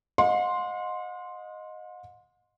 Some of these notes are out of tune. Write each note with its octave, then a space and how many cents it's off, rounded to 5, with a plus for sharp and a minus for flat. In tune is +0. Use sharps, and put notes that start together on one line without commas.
D#5 +0 F#5 -45 C6 +0